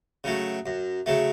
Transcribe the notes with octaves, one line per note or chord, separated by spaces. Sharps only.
C#3 F#3 A3
F#2
C#3 F#3 A3